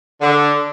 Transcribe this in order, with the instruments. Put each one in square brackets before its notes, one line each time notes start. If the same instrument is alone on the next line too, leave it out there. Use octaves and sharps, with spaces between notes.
[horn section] D3